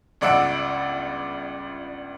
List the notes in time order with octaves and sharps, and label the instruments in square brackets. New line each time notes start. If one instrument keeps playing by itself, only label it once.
[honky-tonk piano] G1 C#2 D5 F#5 E6 D7